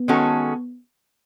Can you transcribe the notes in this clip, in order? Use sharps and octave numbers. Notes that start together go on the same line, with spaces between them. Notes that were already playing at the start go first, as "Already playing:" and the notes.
Already playing: B3
D#3 G#3 C#4 F#4 A4